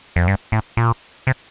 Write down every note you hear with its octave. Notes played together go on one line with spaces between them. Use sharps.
F2
G2
A2
A#2
C3